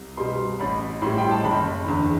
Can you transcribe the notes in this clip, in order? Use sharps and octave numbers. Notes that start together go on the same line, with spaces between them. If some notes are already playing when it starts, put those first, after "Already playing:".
Already playing: C2
B2 G3 C6
A1 B5
A2 G3 C6
G5
A5
F#1 B5
E2 D3